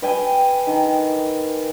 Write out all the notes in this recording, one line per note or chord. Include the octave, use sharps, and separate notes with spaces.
B4 G5 G#5
D#3